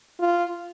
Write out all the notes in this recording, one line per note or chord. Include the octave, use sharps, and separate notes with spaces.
F4